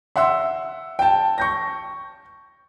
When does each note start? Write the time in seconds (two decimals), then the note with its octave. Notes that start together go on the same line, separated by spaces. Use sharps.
0.16 E5 F#5 C6 E6
0.99 G5 A5
1.38 C#6 G6 A#6